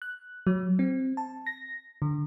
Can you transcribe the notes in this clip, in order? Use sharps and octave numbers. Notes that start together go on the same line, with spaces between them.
F#6
F#3
C4
A5
A#6
D3